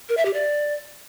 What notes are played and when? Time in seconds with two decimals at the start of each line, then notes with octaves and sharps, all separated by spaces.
0.09 A#4
0.17 E5
0.25 G4
0.34 D5